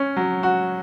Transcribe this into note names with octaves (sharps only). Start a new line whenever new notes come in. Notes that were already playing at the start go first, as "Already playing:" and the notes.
Already playing: C#4
F#3
F#4